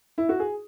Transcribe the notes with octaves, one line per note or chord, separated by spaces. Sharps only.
E4
F#4
G#4